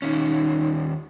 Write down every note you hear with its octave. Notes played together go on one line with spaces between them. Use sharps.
D#2 C#4 D#4